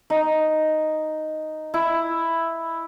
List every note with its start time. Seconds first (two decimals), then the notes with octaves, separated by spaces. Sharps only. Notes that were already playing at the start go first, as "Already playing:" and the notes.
0.10 D#4
1.74 E4